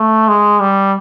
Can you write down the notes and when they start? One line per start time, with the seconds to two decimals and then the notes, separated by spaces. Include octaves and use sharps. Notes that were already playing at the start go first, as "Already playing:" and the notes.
Already playing: A3
0.28 G#3
0.60 G3